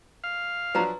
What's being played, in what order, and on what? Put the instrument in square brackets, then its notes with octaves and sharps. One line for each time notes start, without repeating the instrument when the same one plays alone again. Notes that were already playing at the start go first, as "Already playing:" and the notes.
[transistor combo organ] F5
[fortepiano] F3 F#3 D4 [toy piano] B4 A#5